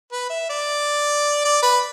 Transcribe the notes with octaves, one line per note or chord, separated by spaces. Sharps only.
B4
E5
D5
D5
B4